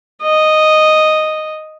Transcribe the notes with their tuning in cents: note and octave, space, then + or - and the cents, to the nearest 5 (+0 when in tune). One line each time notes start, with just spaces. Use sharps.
D#5 -5